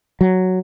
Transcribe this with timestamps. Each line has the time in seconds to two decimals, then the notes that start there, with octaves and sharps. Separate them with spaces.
0.21 F#3